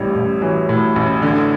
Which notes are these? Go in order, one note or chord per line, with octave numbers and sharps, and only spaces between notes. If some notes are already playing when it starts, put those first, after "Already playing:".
Already playing: A1 A2 G3
A1
E3 F#3
A2
A1
D3